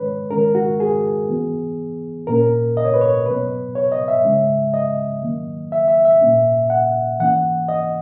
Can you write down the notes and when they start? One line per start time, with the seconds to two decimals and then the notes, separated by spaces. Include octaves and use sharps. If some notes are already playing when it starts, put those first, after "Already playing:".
Already playing: D#3 G#3 C#4 B4 C#5
0.31 D#3 G#3 C#4 A#4
0.55 F#4
0.80 G#4
1.29 E3 B3
2.27 A#2 A#3 C#4 A#4
2.77 D#5
2.85 C#5
2.94 B4
3.01 C#5
3.26 B2 F#3 B3 B4
3.75 C#5
3.92 D#5
4.08 E5
4.24 C#3 G#3 C#4
4.74 D#5
5.23 D#3 F#3 A#3
5.72 E5
5.88 E5
6.05 E5
6.21 A#2 A#3 C#4
6.70 F#5
7.19 E3 A#3 C#4 F#5
7.68 D#5